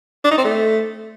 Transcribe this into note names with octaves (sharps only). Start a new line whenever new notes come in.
D4
D#4
C4
A3